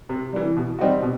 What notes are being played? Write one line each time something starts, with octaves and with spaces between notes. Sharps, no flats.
C3
E3 G3
B2
G3 C4 D#4 F#4
B2